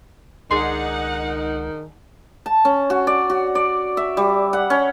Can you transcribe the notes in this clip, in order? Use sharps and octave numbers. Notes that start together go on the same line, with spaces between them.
C#2 D#3 D4 D#4 G#4 F#5 C6
A5
C#4
F#4
D5
F#4
D5
E5
G3
F#5
C#4